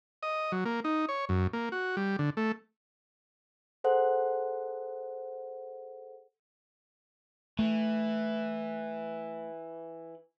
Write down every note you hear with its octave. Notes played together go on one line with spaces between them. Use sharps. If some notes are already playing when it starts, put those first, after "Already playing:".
D#5
F#3
A#3
D#4
C#5
F#2
A#3
F#4
G3
D3
A3
G#4 A4 C5 F#5
E3 A3